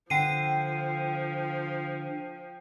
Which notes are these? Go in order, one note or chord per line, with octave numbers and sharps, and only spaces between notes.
D3 F3 G5 C7 D#7